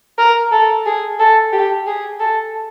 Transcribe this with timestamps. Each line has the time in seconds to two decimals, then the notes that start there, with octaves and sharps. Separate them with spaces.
0.18 A#4
0.52 A4
0.86 G#4
1.20 A4
1.53 G4
1.87 G#4
2.20 A4